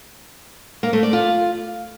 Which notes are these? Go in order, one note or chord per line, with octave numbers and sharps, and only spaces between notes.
A#3
A3
D5
F4